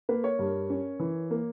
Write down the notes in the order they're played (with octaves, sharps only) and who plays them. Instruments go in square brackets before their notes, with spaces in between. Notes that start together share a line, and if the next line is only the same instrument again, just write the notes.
[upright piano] A#3 B4
A#4 C#5
G2
C#4
E3
A#3